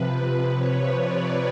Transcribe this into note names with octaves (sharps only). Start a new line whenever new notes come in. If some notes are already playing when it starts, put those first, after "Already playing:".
Already playing: C3 F3 B4
C#5
D5